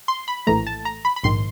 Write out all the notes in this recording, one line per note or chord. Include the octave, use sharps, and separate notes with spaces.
C6
B5
A#1 A2 E3 A3 A#5
A5
A#5
B5
B5
A#1 G#2 D#3 C6